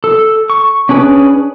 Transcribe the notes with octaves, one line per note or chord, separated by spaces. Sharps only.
A4
C#6
C#4 D4 G#4 B4